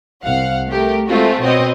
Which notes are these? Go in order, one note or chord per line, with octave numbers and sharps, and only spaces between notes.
C2 F5 F#5
A3 G4 A#4
G#3 A3 C4 F4 F#4
B2 C4 F#4 C#5 D#5